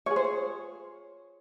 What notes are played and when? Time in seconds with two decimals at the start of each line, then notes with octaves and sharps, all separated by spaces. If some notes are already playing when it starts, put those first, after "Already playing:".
0.06 F4 G#4 C#5
0.16 C5
0.24 C#5